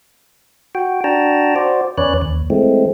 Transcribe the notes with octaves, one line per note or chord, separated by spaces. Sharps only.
F#4 G5
D4 F#4 G5 A5 A#5
F#4 C5 D5
E2 C#4 B4 C#5 D5 F#6
D#2
E3 G#3 A3 C4